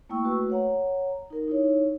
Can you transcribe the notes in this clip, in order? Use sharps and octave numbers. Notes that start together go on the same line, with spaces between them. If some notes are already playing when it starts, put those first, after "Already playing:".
A3 A#3 E4 G5 C#6 E6
A3 F#4 B4
C#5 F#5 A#5
D#4 A#4
D#4 E4 C#5